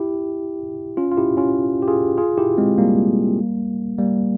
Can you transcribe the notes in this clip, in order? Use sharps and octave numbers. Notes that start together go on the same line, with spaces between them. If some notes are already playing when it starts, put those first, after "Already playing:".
Already playing: E4 G4
C#4 F4
F4
E4 G4
C#4 F4
G4
F4 G#4
F4 G#4
E4 G4
G#3 C4
G3 A#3
G3 A#3